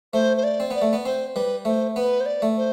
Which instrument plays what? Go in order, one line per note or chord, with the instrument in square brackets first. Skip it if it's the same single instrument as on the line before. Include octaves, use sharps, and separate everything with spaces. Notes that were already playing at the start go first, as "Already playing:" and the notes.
[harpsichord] A3 [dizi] C5
[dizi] C5
D5
[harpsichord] C4
[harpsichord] B3 [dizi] D5
[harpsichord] A3
B3
[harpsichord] C4 [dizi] C5
[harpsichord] G3 [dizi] B4
[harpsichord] A3 [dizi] C5
[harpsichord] B3 [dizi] B4
[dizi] C5
D5
[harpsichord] A3
[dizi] C5